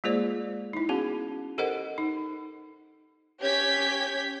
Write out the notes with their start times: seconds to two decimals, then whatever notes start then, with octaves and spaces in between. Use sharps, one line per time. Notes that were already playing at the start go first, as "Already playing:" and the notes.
0.04 G#3 A#3 F4 G#4 C5 D5
0.73 D#4 E4
0.89 B3 C#4 F#4 G#4
1.58 G4 A4 A#4 C5 D#5 F#5
1.98 D#4
3.42 C#4 G4 C#5 G6 G#6 B6